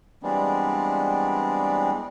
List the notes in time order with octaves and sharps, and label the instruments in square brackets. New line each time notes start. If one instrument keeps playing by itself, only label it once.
[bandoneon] E3 G3 G#3 B3 C4 D4